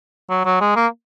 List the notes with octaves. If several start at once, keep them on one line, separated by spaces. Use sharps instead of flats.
F#3
F#3
G#3
A#3